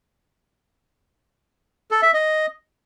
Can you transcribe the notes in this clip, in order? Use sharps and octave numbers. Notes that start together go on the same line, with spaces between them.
A4
E5
D#5